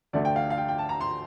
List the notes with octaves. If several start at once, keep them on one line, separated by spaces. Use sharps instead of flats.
D2 D3 A3 D5
G5
F5
F5
G5
G5
A5
A#5
C6